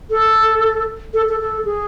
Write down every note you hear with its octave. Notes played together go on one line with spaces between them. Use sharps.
A4
A4
A4
A4
G#4